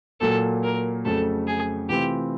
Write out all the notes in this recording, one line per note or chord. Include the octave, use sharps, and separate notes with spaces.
A#2 F#3 A#3 A4
A#4
F2 C#3 F#3 A3 A4
G#4
C3 E3 A3 C4 F4 G4